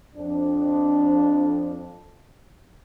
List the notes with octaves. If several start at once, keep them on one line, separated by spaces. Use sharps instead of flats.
F2 D4